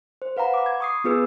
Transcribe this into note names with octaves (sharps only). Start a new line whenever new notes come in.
C5
B4 F5 F#5 A#5 B5
B5 D6
G#6
C#6 D#6 C7
B3 F4 G#4 B4 E6